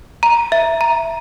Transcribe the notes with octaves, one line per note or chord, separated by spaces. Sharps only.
A#5
E5
A#5